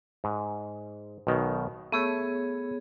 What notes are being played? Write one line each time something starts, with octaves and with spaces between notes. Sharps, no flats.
G#2
B1 B2 D#3
A3 B3 G#4 C#5